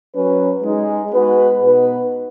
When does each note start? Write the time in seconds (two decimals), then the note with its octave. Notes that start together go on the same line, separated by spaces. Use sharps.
0.14 F#3 C#4 B4
0.63 G#3 D#4 G#4
1.12 G#3 B3 F#4 B4
1.62 B2 B3 D#4 B4